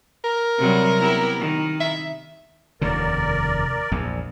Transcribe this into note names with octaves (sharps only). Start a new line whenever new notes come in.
A#4
C3 F#3 G3
B3 E4 G4
D#3
E5
F1 D#2 C#3 A#4 D5
A#1 E2